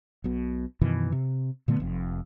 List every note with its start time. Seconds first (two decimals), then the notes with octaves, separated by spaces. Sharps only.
0.24 B1 B2
0.81 F#2 B2 D#3 E3
1.12 C3
1.68 A#2 D3 A3 B3
1.80 F1 F2